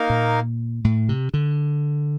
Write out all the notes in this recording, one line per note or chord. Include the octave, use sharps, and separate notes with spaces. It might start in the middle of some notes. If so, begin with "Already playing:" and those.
Already playing: A#3 D#4 A#4 F5
A#2
A2
C3
D3